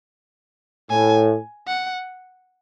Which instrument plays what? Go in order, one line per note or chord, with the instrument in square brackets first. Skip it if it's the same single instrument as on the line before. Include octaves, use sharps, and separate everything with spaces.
[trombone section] A2 [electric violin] G#5
[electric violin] F#5